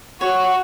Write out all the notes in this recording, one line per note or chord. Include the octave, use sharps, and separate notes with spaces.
F#4 C#5